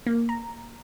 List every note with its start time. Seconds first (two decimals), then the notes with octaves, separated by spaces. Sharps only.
0.07 A#3
0.29 A#5